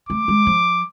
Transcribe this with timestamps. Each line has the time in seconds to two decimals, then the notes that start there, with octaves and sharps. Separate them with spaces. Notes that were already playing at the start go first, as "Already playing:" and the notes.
0.09 A3 D6
0.28 G#3
0.46 F3